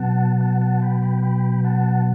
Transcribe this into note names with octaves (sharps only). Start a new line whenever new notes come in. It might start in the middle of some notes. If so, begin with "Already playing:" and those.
Already playing: B2 F#3 B3 F#5 A5
F#5 A5
F#5 A5
G5 B5
G5 B5
G5 B5
F#5 A5